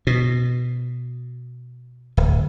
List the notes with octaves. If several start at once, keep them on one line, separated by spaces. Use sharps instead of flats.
B2
D1